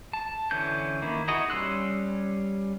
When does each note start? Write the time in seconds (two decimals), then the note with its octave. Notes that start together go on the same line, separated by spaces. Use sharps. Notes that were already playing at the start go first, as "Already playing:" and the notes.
0.13 A5
0.51 D3 E3 C#4 G6
1.02 D#3 A#3 E4
1.28 D#4 E4 F#4 G#4 D#5
1.50 G3 C#4 C6 E6 F#6